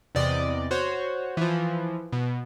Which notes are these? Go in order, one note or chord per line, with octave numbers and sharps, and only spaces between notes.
E2 C3 D5 D#5
F#4 C5 C#5
E3 F3
B2